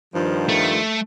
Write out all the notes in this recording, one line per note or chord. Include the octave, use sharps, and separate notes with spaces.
G2 D#3 F3
A3